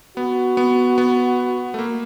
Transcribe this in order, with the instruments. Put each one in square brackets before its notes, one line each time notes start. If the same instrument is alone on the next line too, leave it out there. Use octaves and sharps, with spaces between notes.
[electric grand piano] B3 [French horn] F#4
[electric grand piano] B3
B3
A3
A#3